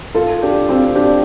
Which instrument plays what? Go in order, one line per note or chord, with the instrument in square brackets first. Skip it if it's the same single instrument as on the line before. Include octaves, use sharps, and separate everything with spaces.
[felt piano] F4 A4
D4 G4
C4 F4
D4 G4